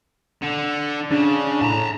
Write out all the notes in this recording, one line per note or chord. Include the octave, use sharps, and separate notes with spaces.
D3 C#7
C#3 D4
A2 A5 A#5